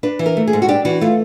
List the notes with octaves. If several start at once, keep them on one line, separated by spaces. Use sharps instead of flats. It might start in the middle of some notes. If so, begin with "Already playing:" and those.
D4 B4
E3
A#4
A3
G#4
G#2
F#4
D4 G4
E3 F#4
A3 F4